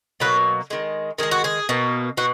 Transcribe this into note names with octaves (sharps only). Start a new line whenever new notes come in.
B2 F#3 A#3 B4
D#3 G#3
D#3 G#3 G#4
F#4
G#4
B2 A#3
B2 F#4